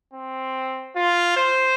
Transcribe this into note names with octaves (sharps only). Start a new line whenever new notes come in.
C4
F4
C5